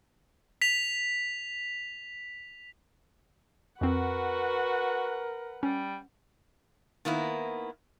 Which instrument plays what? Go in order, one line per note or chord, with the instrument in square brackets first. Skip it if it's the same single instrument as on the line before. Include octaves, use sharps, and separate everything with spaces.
[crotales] B6 F7
[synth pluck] F2 C4 [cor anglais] F#4 [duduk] A#4 [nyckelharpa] B4 F#5
[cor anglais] G3 [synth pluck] C#4
[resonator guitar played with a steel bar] D#3 A#3 B3 E4